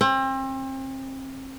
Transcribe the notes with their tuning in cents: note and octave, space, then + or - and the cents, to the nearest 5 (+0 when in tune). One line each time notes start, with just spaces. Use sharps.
C4 +35